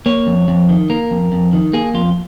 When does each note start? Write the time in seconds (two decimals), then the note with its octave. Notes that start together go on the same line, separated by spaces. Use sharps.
0.06 A#3 C#5
0.27 F2
0.48 F2
0.69 D#3
0.90 A#3 A#4
1.11 F2
1.32 F2
1.53 D#3
1.73 A#3 G#4
1.94 F2 F4